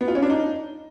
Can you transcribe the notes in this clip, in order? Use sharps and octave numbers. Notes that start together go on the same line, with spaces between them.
B3
F4
C#4
D4
D#4